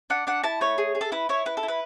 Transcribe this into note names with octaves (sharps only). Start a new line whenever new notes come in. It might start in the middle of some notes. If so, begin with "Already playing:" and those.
D4 F#5
D4 F#5
E4 A5
A3 C#5
G#4
G#4
A4
E4 B4
E4 C#5
E4 B4
A4
E4
B4